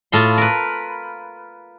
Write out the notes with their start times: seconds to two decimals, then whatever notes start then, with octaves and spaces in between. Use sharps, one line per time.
0.12 A2 F4 C6
0.38 A#4 B4